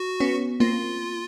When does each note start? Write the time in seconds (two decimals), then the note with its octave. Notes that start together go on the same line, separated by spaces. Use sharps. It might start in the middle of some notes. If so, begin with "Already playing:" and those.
Already playing: F#4
0.20 B3 C#4
0.60 A#3 C4 F4